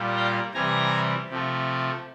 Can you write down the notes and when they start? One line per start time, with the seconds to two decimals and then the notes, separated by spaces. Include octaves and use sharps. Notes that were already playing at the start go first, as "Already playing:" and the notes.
Already playing: A#2 G3 A#3
0.16 F5 G5
0.54 C3 E3 G3 G#5 A#5
1.30 C3 F3 A3